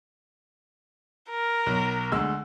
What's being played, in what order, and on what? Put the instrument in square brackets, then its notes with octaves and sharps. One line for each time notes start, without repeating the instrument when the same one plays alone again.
[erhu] A#4
[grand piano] B1
D2 G#3 E6